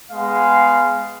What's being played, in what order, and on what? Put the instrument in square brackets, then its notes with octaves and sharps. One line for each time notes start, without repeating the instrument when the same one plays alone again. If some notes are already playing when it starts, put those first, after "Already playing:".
[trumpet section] G#3 B3 F5